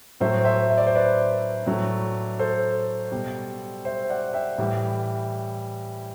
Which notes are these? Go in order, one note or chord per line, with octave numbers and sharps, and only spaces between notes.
A2 F#3 A3 C5 E5
C5 E5
E5
D5
C5
B4 D5
A2 F#3 A3
A4 C5
B2 G3
C5 E5
D5 F#5
E5 G5
A2 E3 G3